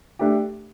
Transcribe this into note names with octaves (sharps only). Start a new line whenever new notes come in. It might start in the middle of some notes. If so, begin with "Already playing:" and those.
A3 D4 G4